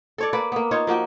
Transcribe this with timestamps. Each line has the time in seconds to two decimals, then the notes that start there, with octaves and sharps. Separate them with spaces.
0.18 A4 C#5 D5
0.33 A#3 B4 D5
0.52 A#3 B3
0.71 D#4 F4 C#5
0.87 F3 A#3 F#4 G5